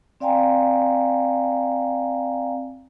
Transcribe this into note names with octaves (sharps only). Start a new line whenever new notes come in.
C4 D5 F5 G5 G#5 A#5